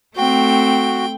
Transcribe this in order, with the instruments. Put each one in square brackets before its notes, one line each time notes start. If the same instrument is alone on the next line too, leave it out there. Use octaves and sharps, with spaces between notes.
[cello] A3 C4 [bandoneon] F#4 [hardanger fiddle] G5